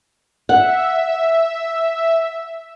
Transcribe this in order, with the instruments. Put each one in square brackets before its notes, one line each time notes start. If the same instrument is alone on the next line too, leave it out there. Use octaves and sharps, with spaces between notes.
[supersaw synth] E5 [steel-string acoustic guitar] F#5